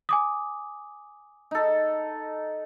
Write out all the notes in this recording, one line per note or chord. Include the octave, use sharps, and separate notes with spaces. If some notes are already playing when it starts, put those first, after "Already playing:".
G#5 D6 D#6
D#4 A4